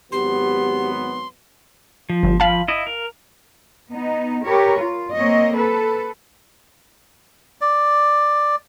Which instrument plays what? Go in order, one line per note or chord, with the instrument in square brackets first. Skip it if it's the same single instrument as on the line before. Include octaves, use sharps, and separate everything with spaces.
[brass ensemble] G#1 F#3 B3 [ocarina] G4 [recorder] C6
[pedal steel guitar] F3
[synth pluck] G1
[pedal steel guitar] F3 B5 [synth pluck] F5 A5
[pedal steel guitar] E4 D#5
A#4
[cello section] B3 D#4
G4 A#4 B4 C#5
F4
A#3 C4 C#5 D#5
A4 B4
[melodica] D5